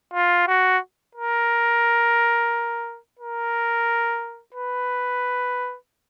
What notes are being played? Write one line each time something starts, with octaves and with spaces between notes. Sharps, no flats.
F4
F#4
A#4
A#4
B4